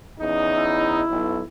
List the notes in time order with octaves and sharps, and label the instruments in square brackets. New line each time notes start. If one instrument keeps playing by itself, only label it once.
[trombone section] E2 C#4 D#4
[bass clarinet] E4
[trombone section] B1